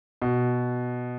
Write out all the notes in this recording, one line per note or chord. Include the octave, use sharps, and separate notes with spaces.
B2